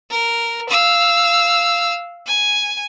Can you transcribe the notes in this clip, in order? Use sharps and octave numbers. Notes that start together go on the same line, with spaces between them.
A#4
F5 E6
G#5